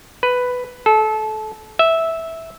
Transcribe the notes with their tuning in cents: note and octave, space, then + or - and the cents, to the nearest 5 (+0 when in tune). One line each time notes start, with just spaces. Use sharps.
B4 +5
A4 -25
E5 -10